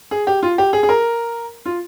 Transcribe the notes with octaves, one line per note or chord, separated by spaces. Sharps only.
G#4
G4
F4
G4
G#4
G#4
A#4
F4